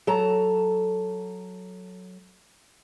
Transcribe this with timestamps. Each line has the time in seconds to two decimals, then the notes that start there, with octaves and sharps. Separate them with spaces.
0.07 F#3 A4 A5 A#5